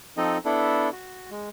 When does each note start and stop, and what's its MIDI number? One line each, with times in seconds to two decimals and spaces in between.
0.17 0.38 53
0.17 0.38 60
0.17 0.38 63
0.17 0.38 69
0.17 0.38 75
0.45 0.90 59
0.45 0.90 62
0.45 0.90 64
0.45 0.90 69
0.93 1.30 66
1.31 1.49 56